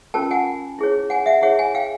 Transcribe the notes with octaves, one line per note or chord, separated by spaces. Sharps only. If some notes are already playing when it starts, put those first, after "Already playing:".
C#4 F4 A#4 G5 A5
F#5 G#5
E4 G#4 C#5
F#5 G#5
E5 F#5
E4 G#4 C#5 E5 F#5
F#5 G#5
F5 G5